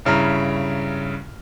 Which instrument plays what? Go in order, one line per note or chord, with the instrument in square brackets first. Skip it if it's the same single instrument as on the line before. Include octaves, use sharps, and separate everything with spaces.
[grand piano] G2 C#3 E4 A#5 F6